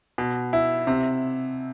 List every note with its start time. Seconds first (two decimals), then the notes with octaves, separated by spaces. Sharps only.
0.18 B2
0.53 E4
0.87 C3